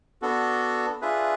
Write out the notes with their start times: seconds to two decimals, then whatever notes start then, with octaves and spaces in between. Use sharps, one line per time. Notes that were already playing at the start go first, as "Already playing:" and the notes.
0.22 B3 D4 F#4 A4
1.01 D4 F4 G#4 B4 E5